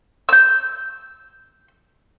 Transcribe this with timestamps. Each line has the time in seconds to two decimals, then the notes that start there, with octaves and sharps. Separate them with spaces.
0.29 E6 G6